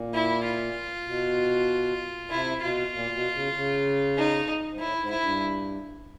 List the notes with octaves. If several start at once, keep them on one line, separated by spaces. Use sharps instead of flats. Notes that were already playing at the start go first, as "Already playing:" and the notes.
Already playing: A#2
E4
F4
B2
C3 E4
B2 F4
A#2
B2
C#3
C#3
D#4
G#2
A2 E4
G#2
E4
G2